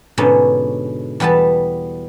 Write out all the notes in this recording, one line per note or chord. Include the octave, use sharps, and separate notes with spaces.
G#2 B2 D3 C#4
E2 G3 B3 B4 A5